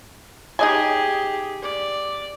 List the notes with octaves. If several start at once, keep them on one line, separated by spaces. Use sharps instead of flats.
D#4 G4 G#4 D#5 G#5
D5